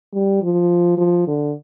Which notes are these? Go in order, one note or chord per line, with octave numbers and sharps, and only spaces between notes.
G3
F3
F3
D3